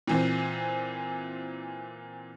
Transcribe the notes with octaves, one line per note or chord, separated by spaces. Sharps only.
A#2 E3 C4